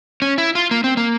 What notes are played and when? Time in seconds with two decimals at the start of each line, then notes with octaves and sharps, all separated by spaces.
0.22 C#4
0.38 E4
0.55 F4
0.71 A#3
0.84 C4
0.97 A#3